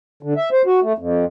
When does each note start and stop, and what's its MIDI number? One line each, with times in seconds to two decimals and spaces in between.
0.23 0.34 50
0.37 0.49 76
0.52 0.62 72
0.66 0.80 66
0.82 0.93 57
0.98 1.24 41